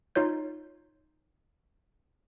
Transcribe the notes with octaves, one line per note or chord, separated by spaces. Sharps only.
D#4 F4 C#5 G6